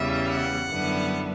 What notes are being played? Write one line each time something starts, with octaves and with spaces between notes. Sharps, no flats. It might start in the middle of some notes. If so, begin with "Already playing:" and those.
Already playing: E2 C#3 E3 G3 E5
F#5
F#2 D3 G3 B3 E4